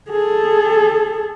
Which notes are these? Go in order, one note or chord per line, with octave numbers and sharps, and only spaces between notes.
G#4 A4